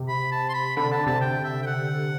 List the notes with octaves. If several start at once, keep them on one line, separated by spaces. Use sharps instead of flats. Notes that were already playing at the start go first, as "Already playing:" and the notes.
Already playing: C3
B5
A5
C6
B5
D3 B5
D3 A5
C3 A5
G5
E5
G5
F#5